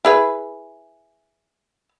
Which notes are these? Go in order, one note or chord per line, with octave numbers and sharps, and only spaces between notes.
E4 G#4 B4